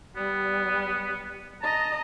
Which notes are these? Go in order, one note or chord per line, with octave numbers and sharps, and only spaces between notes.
G3 B3
D#5 A5 A#5